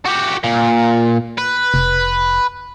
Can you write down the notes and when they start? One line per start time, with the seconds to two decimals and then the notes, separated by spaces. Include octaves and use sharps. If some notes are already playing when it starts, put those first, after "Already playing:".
0.05 F#4 G4
0.44 A#2
1.38 B4
1.74 F1